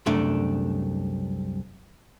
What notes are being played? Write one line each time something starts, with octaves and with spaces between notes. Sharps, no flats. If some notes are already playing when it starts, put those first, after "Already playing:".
C2 F#2 A3 D4